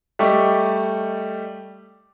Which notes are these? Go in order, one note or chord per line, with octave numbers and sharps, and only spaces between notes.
G3 A3 G4 D#5 C#6